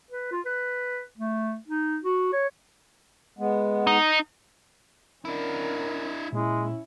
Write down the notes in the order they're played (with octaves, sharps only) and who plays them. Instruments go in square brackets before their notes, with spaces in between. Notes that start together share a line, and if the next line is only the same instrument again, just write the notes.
[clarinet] B4
F4
B4
A3
D#4
F#4
C#5
[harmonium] G#3 B3
[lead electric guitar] D#4
[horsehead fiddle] C#4 A#4 [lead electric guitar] D4 E4
[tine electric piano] A#2 [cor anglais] G#3 [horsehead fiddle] C#4 E4